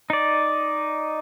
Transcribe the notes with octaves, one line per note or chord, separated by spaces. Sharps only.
D#4 D5